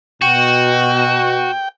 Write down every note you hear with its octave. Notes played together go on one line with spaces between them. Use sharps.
B2 F#4 G5